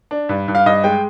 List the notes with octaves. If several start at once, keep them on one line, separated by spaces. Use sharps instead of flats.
D4
G2
G2
F5
G2 D#5
G#3 G5